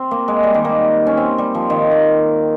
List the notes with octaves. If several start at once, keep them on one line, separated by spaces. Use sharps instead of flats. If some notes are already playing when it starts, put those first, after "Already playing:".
Already playing: C4
A#3
G#3
G3
D#3
A#3
C#4
C4
G3
F3
D#3
A#3